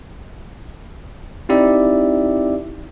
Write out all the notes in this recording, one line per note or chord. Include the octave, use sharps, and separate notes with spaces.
C4 D#4 E4 G4 D5 E5